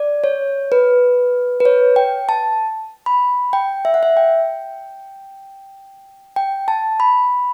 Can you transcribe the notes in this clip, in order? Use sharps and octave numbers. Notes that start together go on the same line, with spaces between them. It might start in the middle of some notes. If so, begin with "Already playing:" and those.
Already playing: D5
C#5
B4
B4
C#5
G5
A5
B5
G5
E5
F#5
E5
G5
G5
A5
B5